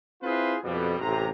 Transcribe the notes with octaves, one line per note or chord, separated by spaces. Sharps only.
C4 E4 F4 G#4 B4 C5
F2 B2 G3
A1 C3 A#5